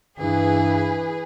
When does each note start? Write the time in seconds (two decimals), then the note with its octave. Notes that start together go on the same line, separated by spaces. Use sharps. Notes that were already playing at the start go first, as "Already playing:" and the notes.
0.19 G2 E3 G#4 B4